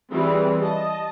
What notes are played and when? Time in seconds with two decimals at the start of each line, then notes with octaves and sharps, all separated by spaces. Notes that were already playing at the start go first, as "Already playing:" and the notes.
0.11 E3 G3 C4 G#4
0.62 D#5 A5